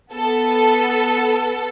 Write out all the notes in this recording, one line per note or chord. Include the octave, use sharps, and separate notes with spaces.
B3 A4